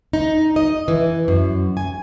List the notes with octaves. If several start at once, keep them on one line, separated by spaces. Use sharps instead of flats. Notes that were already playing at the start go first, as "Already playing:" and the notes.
D#4
D#5
E3
F#2
G#5